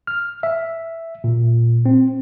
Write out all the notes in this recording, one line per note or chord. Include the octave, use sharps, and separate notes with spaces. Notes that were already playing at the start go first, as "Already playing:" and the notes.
F6
E5
A#2
C4